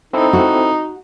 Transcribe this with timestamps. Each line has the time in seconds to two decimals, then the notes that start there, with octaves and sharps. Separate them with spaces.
0.13 C4 D#4 E4 A4
0.33 F#4